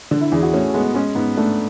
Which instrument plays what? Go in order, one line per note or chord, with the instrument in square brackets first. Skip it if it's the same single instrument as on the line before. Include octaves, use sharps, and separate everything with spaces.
[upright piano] D3 [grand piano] D4
[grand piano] E4
[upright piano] E2 [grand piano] G#4
[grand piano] F#4
[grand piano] A3 [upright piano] C#4
[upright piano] G#3 [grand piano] B3
[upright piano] G#3 [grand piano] C#4
[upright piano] G#2 [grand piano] B3
[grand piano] A3 [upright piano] D4